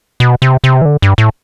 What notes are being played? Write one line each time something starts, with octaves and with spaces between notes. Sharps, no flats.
B2
C3
C3
E3
D3
G2
A2